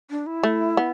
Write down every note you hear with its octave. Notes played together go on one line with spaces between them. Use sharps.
D4
E4
A3
B3